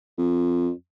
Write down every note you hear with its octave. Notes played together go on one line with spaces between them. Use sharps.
F2